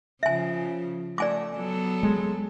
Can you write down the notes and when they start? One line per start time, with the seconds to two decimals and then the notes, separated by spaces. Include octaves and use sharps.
0.23 C#3 F3 E5 G#5
1.18 A3 D5 G#5 D6
1.56 F#3 B3 A4
2.03 G#3